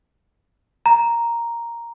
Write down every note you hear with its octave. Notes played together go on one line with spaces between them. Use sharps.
A#5